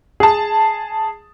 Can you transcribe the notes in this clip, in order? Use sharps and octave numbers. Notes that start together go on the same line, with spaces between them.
G#4 A5